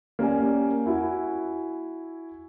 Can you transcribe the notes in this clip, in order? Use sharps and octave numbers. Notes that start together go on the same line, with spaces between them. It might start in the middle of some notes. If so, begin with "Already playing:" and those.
A#3 C#4 G4 A#4 D5 G#5
E4 F#4 G#5